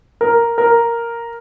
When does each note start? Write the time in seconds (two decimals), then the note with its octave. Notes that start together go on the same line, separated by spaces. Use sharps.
0.21 A#4
0.58 A#4